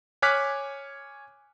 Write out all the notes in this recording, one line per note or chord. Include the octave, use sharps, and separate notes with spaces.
C#5 G#5 D6 F6 F#6 B6